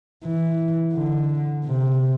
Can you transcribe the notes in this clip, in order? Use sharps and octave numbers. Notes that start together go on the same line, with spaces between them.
E3
D3
C3